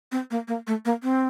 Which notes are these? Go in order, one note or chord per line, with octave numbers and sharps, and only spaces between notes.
C4
A#3
A#3
A3
A#3
C4